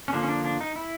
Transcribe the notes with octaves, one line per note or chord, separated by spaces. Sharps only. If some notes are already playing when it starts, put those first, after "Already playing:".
C#4
D3 F3 A#3 D4
C#4
D4
D4
D#4
E4